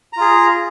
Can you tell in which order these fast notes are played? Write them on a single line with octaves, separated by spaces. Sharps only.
A#5 F4 G#4